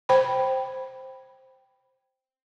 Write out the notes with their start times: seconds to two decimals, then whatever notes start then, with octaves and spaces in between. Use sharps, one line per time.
0.09 C5 G5 B5